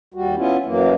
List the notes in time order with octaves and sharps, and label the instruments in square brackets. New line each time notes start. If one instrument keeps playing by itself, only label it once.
[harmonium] D#2 G3 F#4
B3 C#4 E4 F4
F#2 E3 F#3 A#3